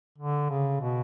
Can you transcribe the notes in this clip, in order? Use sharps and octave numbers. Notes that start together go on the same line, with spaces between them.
D3
C#3
B2